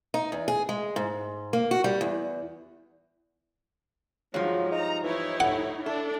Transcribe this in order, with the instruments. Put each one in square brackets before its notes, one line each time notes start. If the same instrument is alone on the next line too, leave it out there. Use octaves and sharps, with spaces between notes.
[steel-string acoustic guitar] D#4
E2
G#4
G#3
G#2
A#3
F#4
G3
E2
[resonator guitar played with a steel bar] G2 F3 [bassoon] F#3 [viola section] G#3 D#4
[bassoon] D#4 [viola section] A#5
[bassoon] E3 [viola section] D#4 E4 C#5
[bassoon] A2 [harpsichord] F#5
[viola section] D4 [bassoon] E4 [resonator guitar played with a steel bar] A4